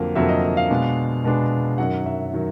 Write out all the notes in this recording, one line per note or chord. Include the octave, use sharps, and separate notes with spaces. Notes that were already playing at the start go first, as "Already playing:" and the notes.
Already playing: F2 D3 F#3 A#3 F5
F2 D3 F#3 A#3 E5
D#5
E5
F5
B2 G#3 B3 D4
B2 G#3 B3 D4
F#2 D#3 F#3 F#5
E5
D#3 F#3